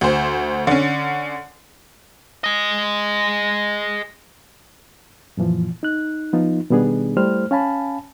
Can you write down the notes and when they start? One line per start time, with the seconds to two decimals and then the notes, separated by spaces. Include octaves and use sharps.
0.01 D2 C5
0.67 D3 C#4
2.44 G#4 D#5
5.37 F#2 A#2 E3 F3
5.83 D#4 F#6
6.33 F3 B3 D#4 F4
6.70 B2 D#3 G3 B3 D4 G#4
7.17 G3 A3 E4 C5 F6
7.51 C#4 F5 G#5 A5 B5